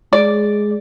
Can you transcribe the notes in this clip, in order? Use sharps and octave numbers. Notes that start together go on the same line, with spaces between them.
G#3 D5